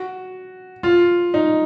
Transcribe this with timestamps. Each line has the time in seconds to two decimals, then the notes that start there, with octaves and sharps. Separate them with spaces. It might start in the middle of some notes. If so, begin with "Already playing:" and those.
Already playing: F#4
0.83 F4
1.34 D#4